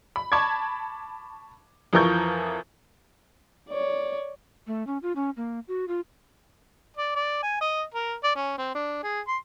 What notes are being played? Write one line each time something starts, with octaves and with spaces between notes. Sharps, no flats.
B5
A5 B5 C#6 D6 G#6
F2 E3 F3 A#4 C#6 G6
C#5 D5
A3
C#4
F4
C#4
A#3
F#4
F4
D5
D5
G#5
D#5
A#4
D5
C#4
C4
D4
G#4
C6